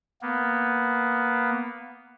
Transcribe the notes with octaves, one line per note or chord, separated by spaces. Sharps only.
A#3 B3